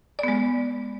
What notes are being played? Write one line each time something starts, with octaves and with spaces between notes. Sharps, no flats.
G#3 B3 D5